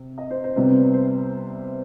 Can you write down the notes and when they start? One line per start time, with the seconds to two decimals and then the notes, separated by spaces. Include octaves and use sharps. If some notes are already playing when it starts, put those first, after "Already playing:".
Already playing: C3
0.18 D#5
0.31 C5
0.44 C5
0.56 C2 C3 G3 B3
0.94 C5